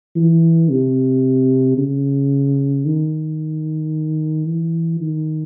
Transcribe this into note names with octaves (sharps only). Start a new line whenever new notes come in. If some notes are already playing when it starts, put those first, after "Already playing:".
E3
C3
C#3
D#3
E3
D#3